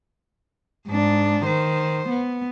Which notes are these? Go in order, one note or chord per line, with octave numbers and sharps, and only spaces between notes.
G#2 D4
D#3 C5
B3